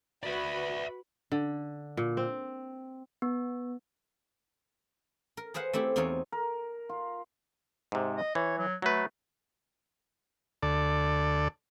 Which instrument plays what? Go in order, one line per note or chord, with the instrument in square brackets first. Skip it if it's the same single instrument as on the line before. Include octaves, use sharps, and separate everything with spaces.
[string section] F#4 B4 B5 [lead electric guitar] D5 E5
[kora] D3
A#2
C4
[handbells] B3
[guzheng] A#4
G#4 B4 C5 F5 F#5
A3 C4 E4 G4
E2 C4 D#4 F4 C#5
[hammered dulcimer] A#4
F4
[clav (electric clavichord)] G#2 C3
[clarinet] D#5
[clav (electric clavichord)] E3 [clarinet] C#5
[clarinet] F#3
[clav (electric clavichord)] F#3 B4 [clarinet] A3
[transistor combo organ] D2 A4 D5